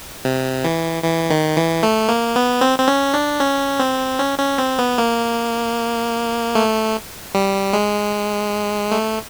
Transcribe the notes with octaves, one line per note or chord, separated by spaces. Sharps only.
C3
E3
E3
D#3
E3
A3
A#3
B3
C4
C4
C#4
D4
C#4
C4
C#4
C#4
C4
B3
A#3
A3
G3
G#3
A3